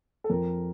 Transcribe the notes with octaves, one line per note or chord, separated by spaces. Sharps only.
A4
F2 A#4